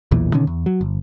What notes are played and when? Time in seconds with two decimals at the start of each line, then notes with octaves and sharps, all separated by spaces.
0.11 B1 E2 A#2 E3
0.33 B2 D3 D#3 C#4
0.47 E2
0.66 F#3
0.81 G1